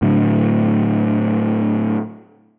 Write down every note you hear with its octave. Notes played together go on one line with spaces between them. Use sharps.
A2 D3 F#3